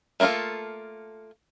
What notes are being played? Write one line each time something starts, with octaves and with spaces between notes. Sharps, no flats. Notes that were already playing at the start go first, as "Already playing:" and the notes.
A3 A#3 E4 F4 A4